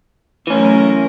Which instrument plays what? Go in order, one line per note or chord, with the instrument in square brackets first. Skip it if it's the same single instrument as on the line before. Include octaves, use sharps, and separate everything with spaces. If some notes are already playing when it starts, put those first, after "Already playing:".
[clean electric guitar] E3 C#4 [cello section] F#3 A3 A#4